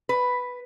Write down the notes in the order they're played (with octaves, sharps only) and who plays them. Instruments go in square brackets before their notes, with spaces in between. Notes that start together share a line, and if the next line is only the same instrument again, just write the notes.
[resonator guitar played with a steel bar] B4